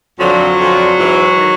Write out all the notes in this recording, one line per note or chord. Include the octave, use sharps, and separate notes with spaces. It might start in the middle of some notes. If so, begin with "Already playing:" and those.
F2 D3 F3 F#3
F2 D3 F3
G#2 E3
D#3